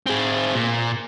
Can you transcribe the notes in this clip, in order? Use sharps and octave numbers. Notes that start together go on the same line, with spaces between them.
C4 G#4
A#2